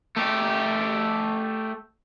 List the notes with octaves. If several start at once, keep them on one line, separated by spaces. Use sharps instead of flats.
A3 G4